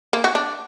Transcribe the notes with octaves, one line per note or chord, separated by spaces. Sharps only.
A#3
F#4
D4